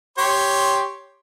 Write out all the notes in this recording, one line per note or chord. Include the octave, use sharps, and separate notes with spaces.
G4 C#5 C6